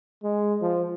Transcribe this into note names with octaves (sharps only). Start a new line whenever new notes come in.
G#3
F3